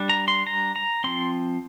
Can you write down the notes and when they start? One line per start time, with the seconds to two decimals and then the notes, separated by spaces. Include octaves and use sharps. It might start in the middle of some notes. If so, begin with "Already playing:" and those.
Already playing: G3 D4
0.09 A#5
0.28 C6
0.47 A#5
0.76 A#5
1.04 F3 C4 C6